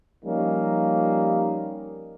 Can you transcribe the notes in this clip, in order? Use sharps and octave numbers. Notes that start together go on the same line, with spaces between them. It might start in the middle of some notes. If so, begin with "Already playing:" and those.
F3 G3 A#3 C#4 D#4